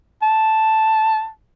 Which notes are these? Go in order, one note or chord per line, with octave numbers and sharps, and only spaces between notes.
A5